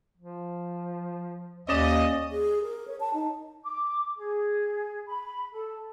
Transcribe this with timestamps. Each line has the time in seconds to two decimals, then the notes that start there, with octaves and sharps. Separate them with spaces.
0.17 F3
1.68 D#2 C#4 D5 D#5 E7
2.32 G#4
2.63 A#4
2.87 C#5
3.00 A5
3.14 D#4
3.63 D6
4.16 G#4
5.07 B5
5.52 A4